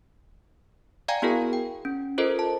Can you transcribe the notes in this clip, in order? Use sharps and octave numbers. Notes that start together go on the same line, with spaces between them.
D5 F5 G5 G#5 A#5 G#6
B3 E4 F#4 G#4 A#4
G5
C#4
F4 A4 A#4 C5 D#5
A5